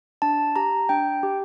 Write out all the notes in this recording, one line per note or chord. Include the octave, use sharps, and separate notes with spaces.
D4 A5
G4 A#5
D4 G5
G4